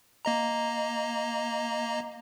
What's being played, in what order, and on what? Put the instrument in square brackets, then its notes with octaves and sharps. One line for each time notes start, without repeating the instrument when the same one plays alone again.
[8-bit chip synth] A#3 D#5 A#5